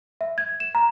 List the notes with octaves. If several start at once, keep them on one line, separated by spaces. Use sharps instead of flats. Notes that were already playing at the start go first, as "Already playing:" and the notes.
E5
G#6
E7
A#5